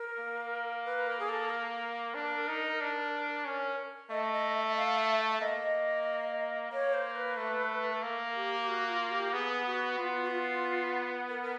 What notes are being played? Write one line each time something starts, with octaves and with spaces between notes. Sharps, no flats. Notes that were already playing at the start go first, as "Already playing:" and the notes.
Already playing: A#4
A#3
B4
A#4
G#4
A4
A#4
D4
D#4
D4
C#4
A3 D#5
D#5
E5
D#5
E5
F5
E5
E5
E5
A#3 D#5
A#3 C#5
C5
B4
A3
A4
A#3 A#4
G4
G4
F#4
F4
G4
B3 G#4
F#4
B3 F4
F#4
F4
A#4
A#4